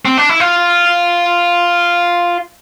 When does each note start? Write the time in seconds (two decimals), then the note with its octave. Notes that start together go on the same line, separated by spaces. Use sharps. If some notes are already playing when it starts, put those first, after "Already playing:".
0.05 C4
0.18 D4
0.29 E4
0.40 F4